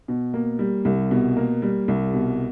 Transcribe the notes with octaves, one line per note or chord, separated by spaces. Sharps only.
B2
A#3
G3
C2
B2
A#3
G3
C2
B2